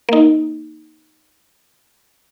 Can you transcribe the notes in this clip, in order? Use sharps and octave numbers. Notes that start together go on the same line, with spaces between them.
A#3 D#4